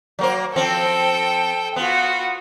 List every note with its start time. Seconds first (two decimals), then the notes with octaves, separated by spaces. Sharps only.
0.19 F#3 A#3 C5
0.56 F3 C4 A4 G5
1.76 B3 F4 F#4